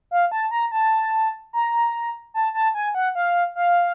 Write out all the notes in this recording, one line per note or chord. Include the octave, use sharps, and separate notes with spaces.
F5
A5
A#5
A5
A#5
A5
A5
G#5
F#5
F5
F5